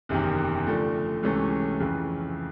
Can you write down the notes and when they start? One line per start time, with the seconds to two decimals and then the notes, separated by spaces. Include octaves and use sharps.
0.09 F#1 E2 C3 D#3
0.67 D3 F3 A3
1.23 C#2 C3 E3 A3 C#4
1.80 F2 C#3 E3